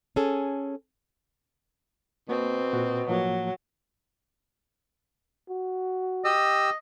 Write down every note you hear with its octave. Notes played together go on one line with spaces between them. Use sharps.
C#4 G#4 A4
B2 A#3 C4
A#2 F#4
A2 F3 F#3 A#3
F#4
G4 D#5 E6